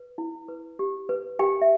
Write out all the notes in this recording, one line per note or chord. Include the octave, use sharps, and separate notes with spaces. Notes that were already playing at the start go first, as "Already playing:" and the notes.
Already playing: B4
E4
B4
G4
B4
G4 A#4 G5
E5